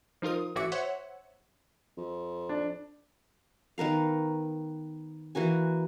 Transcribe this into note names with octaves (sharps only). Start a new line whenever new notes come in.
F3 D#4 F4 A#4 D#6
A1 E3 F#4 E5 D6 C#7
C5 C#5 E5 F#5
F2
D4
D#3 B3 A#4 F5
E3 A#3 F#4 G#5